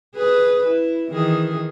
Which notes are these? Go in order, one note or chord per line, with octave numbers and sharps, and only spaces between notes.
G#4 B4
E4
D#3 E3 G#4